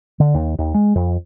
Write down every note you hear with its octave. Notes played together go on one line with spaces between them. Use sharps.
D3
D#2
D#2
G#3
F2